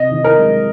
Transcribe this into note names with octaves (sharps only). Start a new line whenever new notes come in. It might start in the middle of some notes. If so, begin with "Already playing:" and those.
Already playing: C3 D#5
D#3
A#4
G#3